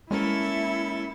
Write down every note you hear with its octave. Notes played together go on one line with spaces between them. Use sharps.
G#3 A#3 C#4 E4 A4 A#4 E5